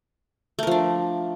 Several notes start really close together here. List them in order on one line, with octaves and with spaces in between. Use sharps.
A3 A#4 F3 D4